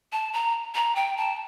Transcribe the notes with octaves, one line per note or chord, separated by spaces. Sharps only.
A5
A#5
A#5
G5
A5